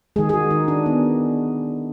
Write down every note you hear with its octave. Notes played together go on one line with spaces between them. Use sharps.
D#3 G#3 G#4
G#4
F#4
D#4
D4
B3